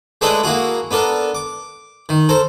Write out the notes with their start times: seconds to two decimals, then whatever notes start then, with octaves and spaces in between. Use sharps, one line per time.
0.21 G#3 A3 D4 E4 B4 D#5
0.43 A#3 E4 F#4 G#4
0.91 B3 D4 A4 A#4
1.35 D6
2.09 D#3
2.29 A4 A#4 C5